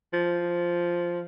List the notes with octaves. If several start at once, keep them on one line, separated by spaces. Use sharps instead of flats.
F3